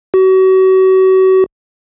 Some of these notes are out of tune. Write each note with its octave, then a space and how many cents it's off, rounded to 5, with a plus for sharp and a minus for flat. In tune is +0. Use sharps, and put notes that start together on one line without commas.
F#4 +35